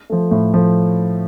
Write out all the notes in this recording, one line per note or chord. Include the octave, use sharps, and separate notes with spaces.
F3 A3
A2
F3 A3